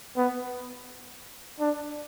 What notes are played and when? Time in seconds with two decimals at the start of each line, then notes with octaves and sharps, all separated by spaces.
0.17 B3
1.60 D4